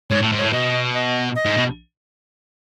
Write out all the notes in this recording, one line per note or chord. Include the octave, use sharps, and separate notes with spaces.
G#2 C#5
A2
G#2
A2 C#5
B2 D#5
D#5
D#5
G#2
B2